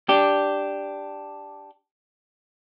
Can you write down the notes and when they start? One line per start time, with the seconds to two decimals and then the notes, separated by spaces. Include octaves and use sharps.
0.09 D4 G4